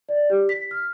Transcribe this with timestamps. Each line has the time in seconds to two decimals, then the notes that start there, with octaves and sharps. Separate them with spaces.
0.09 D5
0.30 G4
0.49 B6
0.71 F6